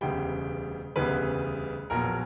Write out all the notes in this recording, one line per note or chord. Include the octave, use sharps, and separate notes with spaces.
E1 D2 C#3 G3 B3 G5
E1 D2 C#3 G3 B3 B4
A#1 A#2 F#3 B3 A#4